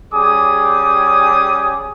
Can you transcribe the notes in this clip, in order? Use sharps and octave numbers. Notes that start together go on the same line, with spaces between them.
G3 C#4 G#4 G#5 D6 D#6